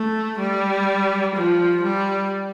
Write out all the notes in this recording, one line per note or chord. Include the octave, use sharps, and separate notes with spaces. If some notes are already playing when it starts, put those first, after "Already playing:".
Already playing: A3
G3
F3
G3